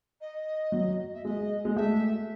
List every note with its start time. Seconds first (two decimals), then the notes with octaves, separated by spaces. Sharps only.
0.21 D#5
0.72 F#3
1.14 E5
1.25 G#3 D#5
1.65 G#3
1.76 A3 E5